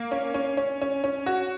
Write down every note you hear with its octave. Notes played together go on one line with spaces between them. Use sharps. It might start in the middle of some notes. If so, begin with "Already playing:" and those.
Already playing: A#3
C#4
C#4
C#4
C#4
C#4
F#4